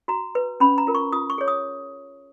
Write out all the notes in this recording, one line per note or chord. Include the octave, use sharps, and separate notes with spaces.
F#4 A#5
B4
C#4 B5
A#5
F4 A#4
C#6
F4 D#6
C#6
G#4 C#5
D#6